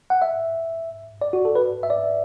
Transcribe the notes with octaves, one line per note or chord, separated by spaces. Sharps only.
F#5
E5
D5
F#4
A4
B4
E5
D5